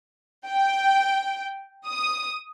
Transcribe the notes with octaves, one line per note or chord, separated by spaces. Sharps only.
G5
D#6